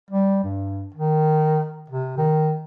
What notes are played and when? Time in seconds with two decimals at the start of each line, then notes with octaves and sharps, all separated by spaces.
0.11 G3
0.44 G2
0.95 D#3
1.90 C3
2.18 D#3